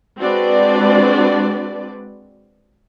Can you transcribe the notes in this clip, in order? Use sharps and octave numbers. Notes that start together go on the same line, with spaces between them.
G#3 C4 D4 F#4 B4 D5